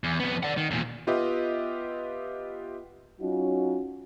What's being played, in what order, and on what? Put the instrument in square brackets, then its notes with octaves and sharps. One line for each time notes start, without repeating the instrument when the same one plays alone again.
[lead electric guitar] E2
F2 B3
D5 F#5
D#3
E2 A#2
[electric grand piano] B3 F4 G4 B4 D#5 E5
[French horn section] F#3 C#4 D#4 F4 F#4